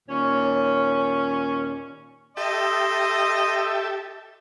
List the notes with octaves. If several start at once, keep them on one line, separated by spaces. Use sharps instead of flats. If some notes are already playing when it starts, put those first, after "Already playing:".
D#2 A#2 C#4
G4 A4 D#5 E5 C6